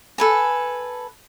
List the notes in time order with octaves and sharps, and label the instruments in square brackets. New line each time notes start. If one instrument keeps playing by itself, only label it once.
[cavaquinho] A4 B4 G#5